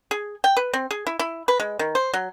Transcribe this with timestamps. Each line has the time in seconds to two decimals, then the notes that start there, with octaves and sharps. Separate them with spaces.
0.11 G#4
0.44 G5
0.57 B4
0.73 C4
0.91 G#4
1.07 E4
1.19 E4
1.48 B4
1.60 G#3
1.79 D#3
1.95 C5
2.14 F#3